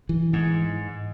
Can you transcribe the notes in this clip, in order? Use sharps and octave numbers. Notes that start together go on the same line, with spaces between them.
E3
G#2